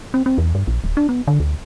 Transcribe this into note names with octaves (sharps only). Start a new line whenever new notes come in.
C4
C4
E2
G2
A#1
D1
D4
B3
D3
D2